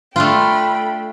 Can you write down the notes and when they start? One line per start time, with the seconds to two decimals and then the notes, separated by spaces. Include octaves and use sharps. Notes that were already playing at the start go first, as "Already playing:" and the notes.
0.16 A3 D4 F4 G5 B5